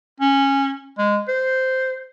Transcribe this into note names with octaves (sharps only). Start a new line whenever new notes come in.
C#4
G#3
C5